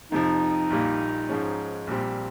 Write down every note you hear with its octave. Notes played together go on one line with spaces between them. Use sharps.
F2 C3 F3 D#4
A#1 A#2 G3 A#3
G#2 F3 G#3 C#4
A#1 A#2 G3 C4